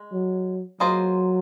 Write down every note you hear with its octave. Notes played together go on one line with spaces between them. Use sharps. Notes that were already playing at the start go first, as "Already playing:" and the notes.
Already playing: G#3
F#3
F#3 A#3 F4 G#4 C5 D#5